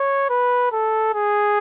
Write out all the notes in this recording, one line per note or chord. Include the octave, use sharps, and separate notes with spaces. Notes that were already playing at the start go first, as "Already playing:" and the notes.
Already playing: C#5
B4
A4
G#4